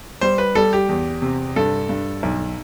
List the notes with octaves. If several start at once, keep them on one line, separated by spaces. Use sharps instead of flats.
G3 C5
B4
G3 A4
G4
E2
C3
G2 A4
G2
B1